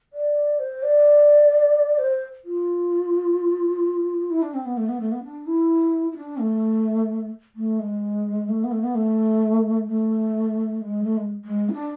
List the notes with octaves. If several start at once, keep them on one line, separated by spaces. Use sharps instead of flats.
D5
C5
D5
C5
F4
E4
D4
C4
B3
A3
B3
A3
B3
D4
E4
E4
D4
A3
A3
G#3
A3
B3
A3
B3
A3
A3
G#3
A3
G#3
G#3
E4
D4